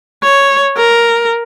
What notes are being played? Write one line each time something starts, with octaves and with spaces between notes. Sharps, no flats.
C#5
A#4